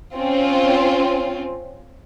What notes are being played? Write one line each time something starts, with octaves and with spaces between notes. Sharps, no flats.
C4 C#4 F4